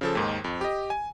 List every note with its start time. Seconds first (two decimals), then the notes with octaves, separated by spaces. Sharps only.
0.01 C#3 F3 A4
0.15 D#2 G#2 D#3
0.44 F2
0.61 G4 D#5
0.90 G#5